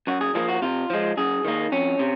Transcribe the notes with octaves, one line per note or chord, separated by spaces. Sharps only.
F#2 F#4
G#4
F3 A#3 G#4
F#4
C3 F4
F3 G#3
F#2 G#4
D#3 A#3
F2 C#4
C3